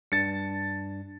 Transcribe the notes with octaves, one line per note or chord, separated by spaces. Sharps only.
G2 D4 A5 A6 C#7